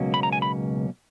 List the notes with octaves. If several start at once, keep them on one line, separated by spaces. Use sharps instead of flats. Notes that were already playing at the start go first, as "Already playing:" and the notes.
Already playing: C#2 B2 F#3 A#3 C#4
B5
A#5
G#5
B5